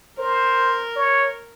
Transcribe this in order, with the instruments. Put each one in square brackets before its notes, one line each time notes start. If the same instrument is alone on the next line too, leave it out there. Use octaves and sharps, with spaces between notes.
[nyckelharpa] A#4 [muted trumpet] C5
[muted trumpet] C#5